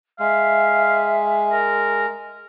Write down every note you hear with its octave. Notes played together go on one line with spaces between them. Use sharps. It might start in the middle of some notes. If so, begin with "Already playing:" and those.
G#3 E5 F5
A#4